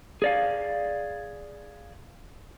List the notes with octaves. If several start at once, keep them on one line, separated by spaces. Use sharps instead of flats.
G#4 D5 F5